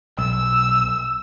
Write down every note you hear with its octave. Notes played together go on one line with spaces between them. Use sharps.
B1 E6